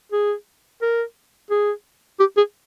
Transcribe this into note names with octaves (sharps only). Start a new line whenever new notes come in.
G#4
A#4
G#4
G4
G#4